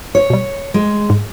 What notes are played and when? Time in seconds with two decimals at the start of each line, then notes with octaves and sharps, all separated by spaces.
0.15 C#5
0.30 B2 G3
0.74 G#3
1.10 G#2